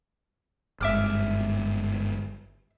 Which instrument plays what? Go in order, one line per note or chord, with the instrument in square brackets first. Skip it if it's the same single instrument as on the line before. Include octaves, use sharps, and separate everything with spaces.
[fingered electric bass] G1 G#2 [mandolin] E5 D6 F6